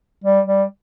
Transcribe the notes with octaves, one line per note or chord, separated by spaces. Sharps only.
G3
G3